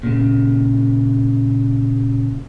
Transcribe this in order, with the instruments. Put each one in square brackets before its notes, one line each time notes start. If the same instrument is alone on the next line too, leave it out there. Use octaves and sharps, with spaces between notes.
[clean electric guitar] A#2 C#3